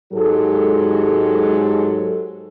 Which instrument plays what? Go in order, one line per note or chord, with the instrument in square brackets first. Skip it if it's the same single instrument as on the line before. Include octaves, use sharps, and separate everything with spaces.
[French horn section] G#2 F#3 G#3 G4 A4